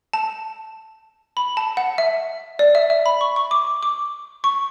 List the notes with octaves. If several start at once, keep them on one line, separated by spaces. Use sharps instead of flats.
A5
B5
A5
F#5
E5
D5
E5
E5
B5
C#6
C#6
D6
D6
C#6